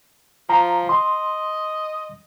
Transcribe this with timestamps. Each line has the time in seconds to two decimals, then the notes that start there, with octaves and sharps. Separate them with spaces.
0.50 F3 A#5
0.89 D#5 C6